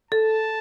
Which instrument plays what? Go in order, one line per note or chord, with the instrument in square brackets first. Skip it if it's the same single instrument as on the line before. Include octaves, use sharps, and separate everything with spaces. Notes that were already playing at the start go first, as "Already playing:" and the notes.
[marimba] A4 [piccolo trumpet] A5